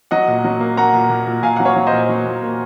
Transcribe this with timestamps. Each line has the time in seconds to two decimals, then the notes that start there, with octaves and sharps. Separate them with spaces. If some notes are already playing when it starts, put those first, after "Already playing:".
0.11 F#3 D#5 F#5
0.28 A#2
0.44 F#3
0.60 A#3
0.77 A#3 F#5 A#5
0.94 A#2
1.10 A#2
1.27 A#2
1.43 A#2 F5 G#5
1.56 F#3 F#5
1.65 C#5 F5
1.76 F#3
1.87 C5 D#5
1.93 A#2
2.09 F#3
2.26 A#2
2.43 A#3